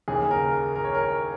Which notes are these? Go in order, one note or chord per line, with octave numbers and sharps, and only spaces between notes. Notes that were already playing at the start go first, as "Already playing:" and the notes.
D#2 C#3 G#4
A#4
A#4
C#5
A#4